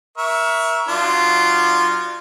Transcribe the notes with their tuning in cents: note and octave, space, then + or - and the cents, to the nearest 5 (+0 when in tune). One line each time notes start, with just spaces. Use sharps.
A#4 +30 E5 +0 C#6 +15
F#3 +0 D4 +35 F4 -10